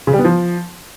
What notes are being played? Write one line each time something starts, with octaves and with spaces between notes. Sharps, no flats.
C#3
G3
B3
F3